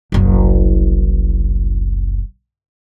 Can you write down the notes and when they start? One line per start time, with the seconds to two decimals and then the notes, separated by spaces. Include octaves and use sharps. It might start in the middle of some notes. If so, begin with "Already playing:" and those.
0.12 F#1 C2